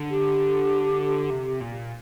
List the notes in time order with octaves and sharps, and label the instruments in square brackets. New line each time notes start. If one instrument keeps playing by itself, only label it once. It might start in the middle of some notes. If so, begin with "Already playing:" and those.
Already playing: [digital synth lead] D3
[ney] G4
[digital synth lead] C3
A#2